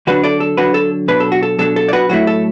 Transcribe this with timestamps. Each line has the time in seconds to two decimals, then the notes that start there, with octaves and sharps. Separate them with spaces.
0.07 D3 F#3 D4 F#4 B4
0.23 A4 D5
0.40 A4
0.57 D3 F#3 D4 F#4 B4
0.74 A4
1.08 B2 F#3 D4 B4
1.20 A4
1.32 F#4
1.43 A4
1.59 B2 F#3 D4 A4
1.76 A4
1.89 D5
1.93 F#4 B4
2.09 A2 F#3 A3 E4 F#4
2.27 A4